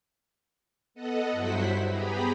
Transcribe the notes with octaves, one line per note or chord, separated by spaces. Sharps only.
B3 A4 D#5 F#5
G2 F#3 E4 C5 F#5 B6
B3 G4 G#4 A#5 B5